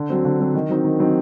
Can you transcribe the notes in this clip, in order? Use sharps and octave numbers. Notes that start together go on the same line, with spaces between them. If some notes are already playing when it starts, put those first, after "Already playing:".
Already playing: D3
F#3 C4
D3
F#3 C4
D#3
F#3 C4 D#4
D#3
F#3 C4 D#4